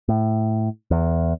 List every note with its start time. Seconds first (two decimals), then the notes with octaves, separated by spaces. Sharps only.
0.09 A2
0.91 E2